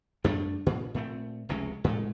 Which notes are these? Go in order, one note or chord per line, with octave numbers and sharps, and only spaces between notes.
F#2 G3 A3 D4
A#2
A#2 A3 C4
F1 C#2 C3 C#4
A2 G#3 A3